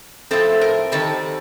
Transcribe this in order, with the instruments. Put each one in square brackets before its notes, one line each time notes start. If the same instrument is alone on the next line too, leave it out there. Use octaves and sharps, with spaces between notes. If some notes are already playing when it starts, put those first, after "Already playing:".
[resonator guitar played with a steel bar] A2 F3 A3 C4 A4
A#4
D#3 G3 C4 A4